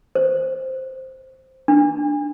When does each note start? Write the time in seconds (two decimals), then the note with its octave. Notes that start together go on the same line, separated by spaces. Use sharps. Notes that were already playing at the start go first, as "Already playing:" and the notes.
0.15 C5
1.68 D4